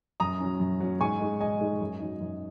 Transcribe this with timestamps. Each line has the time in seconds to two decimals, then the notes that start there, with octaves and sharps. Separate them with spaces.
0.20 F#2 A#5 D#6
0.40 F#3 C#4
0.60 F#2
0.80 F#3 C#4
1.00 G#2 G#5 C#6
1.20 G#3 D#4
1.40 G#2 D#5 G#5
1.60 G#3 D#4
1.80 F#2
2.00 F#3 D#4
2.21 F#2